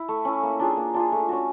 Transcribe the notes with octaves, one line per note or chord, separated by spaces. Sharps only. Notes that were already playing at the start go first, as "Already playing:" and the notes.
Already playing: E4
A3
C#4 E4
A#3
D4 F4 G#4
A#3
D4 F4 G#4
A3
C#4 F#4